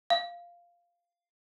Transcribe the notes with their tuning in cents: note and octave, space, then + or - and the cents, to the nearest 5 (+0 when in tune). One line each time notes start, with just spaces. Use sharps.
F5 -5